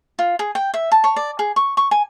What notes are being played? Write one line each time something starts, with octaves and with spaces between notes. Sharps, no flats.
F4
G#4
G5
E5
A5
C#5
D5
G#4
C#6
C#6
G#5